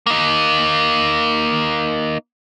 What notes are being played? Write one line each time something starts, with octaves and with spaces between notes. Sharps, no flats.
A#3 D#4